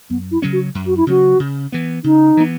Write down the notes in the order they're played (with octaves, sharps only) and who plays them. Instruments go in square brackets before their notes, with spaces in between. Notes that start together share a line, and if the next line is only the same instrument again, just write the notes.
[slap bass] F#2 [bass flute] B3
[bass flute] E4
[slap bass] C#3 F#3 C#4
[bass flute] F#4
[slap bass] F#2
[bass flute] F#4
E4
[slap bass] C#3 F#3 C#4 [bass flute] F#4
[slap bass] C#3
E3 B3
[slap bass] C#3 [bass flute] D#4
[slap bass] E3 B3